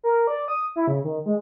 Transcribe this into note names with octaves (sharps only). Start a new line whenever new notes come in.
A#4
D5
D#6
E4
C#3
D#3
G#3